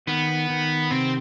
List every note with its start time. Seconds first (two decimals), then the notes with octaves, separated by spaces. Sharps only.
0.07 D#3 B3
0.50 D#3
0.90 C3 C4